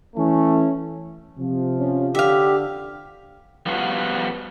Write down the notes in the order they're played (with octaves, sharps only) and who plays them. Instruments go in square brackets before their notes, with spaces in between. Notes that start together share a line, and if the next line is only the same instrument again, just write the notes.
[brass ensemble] E3 A3 C#4
C3 F3
[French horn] C#4
[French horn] D3 [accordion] G4 [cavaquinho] E5 F5
[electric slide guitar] F3 G3 B3 F4 F#4